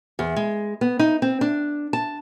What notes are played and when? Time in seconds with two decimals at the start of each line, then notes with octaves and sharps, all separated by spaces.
0.19 E2
0.36 G#3
0.81 B3
0.99 D#4
1.22 C4
1.41 D4
1.93 A5